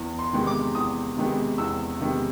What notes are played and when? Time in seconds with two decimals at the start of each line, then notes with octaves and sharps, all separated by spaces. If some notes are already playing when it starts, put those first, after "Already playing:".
Already playing: E2
0.19 C6
0.33 C3 D#3 G#3 B3
0.47 D6
0.75 E2 D#6
1.17 C3 D#3 G#3 B3
1.58 E2 E6
2.00 C3 D#3 G#3 B3